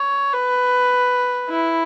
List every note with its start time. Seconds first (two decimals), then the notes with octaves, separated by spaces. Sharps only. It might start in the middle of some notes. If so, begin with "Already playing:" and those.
Already playing: C#5
0.33 B4
1.49 E4